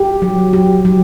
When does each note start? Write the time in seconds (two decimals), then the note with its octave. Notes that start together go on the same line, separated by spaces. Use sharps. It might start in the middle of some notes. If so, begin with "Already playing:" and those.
Already playing: G4
0.22 F#3
0.53 G4
0.85 F#3